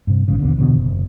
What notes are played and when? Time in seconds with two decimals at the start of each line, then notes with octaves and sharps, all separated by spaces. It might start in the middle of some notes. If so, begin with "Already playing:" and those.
0.07 G2 C3
0.28 A1 G#2 C#3
0.40 D#2 B2 D3
0.57 C2 B2 D3 E3
0.75 F#1